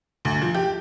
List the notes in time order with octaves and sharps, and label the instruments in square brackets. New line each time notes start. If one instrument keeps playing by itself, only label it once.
[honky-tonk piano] D2
F3
G4